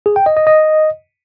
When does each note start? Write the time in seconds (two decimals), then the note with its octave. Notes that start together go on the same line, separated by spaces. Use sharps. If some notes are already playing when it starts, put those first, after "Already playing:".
0.06 G#4
0.16 G5
0.26 D#5
0.37 D#5
0.47 D#5